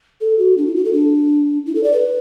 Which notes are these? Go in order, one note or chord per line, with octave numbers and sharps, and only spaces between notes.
A4
F#4
D4
E4
F#4
A4
D4
E4
A4
D5
B4